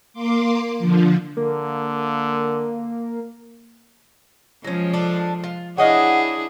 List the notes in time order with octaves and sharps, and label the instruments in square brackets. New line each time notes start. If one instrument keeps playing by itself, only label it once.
[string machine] A#3 C6 D6
D3 F3
[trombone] D3 [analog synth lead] A#3
[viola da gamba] F3 G#3 [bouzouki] F#3 C#4
[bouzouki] D4 A4
F4
[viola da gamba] D4 E4 G#4 [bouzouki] C#5 D#5 F5 [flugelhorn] F#5